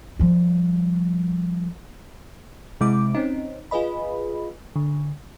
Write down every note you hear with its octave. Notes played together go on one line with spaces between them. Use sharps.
F3 G3
C3 G#3 C4 E4 D6
C4 C#4 D#4
F4 G#4 B4 D#5 B5
D3